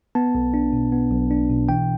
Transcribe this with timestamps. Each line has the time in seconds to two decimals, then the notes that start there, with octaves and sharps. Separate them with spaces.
0.15 B3 A5
0.35 B1
0.54 D4
0.73 B2
0.92 B3
1.11 B1
1.31 D4
1.50 B2
1.69 E3 G5